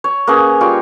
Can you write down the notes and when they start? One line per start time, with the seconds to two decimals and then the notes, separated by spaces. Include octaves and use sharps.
0.04 C#5
0.27 A#3 B3 C#4 G#4
0.61 G3 F4 C#5 G5